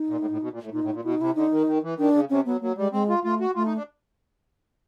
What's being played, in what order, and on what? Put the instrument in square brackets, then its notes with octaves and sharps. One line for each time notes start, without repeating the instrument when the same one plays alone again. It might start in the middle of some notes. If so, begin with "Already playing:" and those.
Already playing: [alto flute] D#4
[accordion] A#2
A2
A2
B2
A#2
A2
[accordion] A#2 [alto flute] D#4
[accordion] A2
A#2
[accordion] B2 [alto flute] E4
[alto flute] D#4
[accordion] C3 [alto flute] E4
[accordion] D3 [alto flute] D#4
[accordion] D#3
D#3
E3
[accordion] D#3 [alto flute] D4
[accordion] C#3
[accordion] C3 [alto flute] C#4
[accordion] F#3 [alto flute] B3
[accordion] F#3 [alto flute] A#3
[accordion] G3 [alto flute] G#3
[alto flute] G#3 [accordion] C4
[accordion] F4
[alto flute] A3 [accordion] F4
[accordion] F#4
[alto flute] A3 [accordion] F4
[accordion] D#4
D4